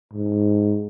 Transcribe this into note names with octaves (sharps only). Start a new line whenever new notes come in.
G#2